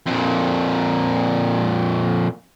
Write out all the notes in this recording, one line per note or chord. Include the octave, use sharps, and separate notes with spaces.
F2 A#2